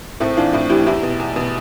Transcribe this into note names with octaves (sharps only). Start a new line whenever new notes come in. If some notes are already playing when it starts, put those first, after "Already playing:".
A2 A3 C4
E3 D4 F4
A2 C4 E4
E3 E4 G4
E2 E4 G4
B2
E2
B2